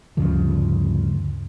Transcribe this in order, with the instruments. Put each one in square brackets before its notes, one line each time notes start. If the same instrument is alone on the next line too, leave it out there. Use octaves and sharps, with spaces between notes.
[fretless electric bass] D2 G2 C#3 F3